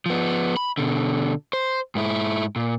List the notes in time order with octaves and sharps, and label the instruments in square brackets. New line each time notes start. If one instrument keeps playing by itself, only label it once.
[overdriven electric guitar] F3 B3
B5
B2 D3
C5
G#2 E4
A#2